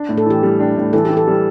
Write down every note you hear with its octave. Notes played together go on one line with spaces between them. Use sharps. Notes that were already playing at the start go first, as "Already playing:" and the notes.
Already playing: D4
A2
A4
E3 G4
G3
D4
A2
E3 A4
G4
E3
A4
G3